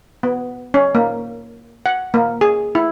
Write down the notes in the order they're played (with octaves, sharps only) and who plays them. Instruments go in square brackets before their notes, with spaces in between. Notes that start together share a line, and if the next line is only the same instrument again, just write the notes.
[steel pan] B3
C#4
A#3
F#5
A#3
G#4
E4